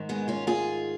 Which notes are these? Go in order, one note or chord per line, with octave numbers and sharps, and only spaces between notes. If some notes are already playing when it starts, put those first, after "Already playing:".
Already playing: G#2 D#3
G#3 B3
C#4 F4
F4 G#4